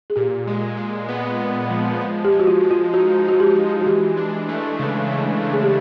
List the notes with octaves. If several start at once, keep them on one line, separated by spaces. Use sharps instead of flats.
G#4
A#2 G4
G#3
G#3
B3
G#3
F3
G#3
G4
G#3
F#4
F4
G#3
F4
D#4 F#4
G#3 F#4
G4
G#3
F#4
E3 G4
D4
A3
C#3
A3
A3
G#4
G4